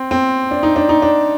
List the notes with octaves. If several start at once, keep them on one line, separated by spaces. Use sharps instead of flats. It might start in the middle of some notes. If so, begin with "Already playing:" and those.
Already playing: C4
C4
D4
D#4
D4
D#4
D4